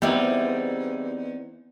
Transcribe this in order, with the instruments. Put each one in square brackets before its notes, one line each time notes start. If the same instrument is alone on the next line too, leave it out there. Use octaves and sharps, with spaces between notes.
[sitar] E2 D#4 [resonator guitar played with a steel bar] G3 E4 [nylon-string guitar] B3 [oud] C4 A#4